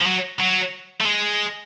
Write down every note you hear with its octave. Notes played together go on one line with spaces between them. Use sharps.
F3
F#3
F#3
A3
G#3